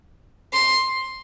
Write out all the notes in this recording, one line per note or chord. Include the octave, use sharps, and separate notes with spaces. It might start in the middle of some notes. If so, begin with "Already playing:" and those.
C6